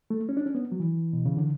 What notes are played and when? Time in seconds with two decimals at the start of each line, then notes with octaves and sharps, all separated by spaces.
0.10 A3
0.29 C#4
0.37 D4
0.46 C#4
0.55 B3
0.72 F#3
0.80 E3
1.13 B2
1.25 C#3
1.37 D3